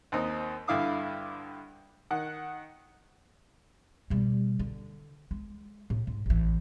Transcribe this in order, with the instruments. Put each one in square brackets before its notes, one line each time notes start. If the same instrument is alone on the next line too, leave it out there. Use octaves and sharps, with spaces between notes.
[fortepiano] D#2 C4 D#4
G2 D3 E4 F5 D6 D#6
D#3 F#5
[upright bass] B2 G3
D3
G#3
A2
G#2
A1 E3